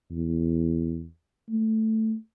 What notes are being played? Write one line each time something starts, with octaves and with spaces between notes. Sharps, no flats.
E2
A3